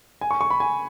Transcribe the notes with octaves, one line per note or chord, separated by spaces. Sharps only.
G#5
C#6
C#6
B5
G#5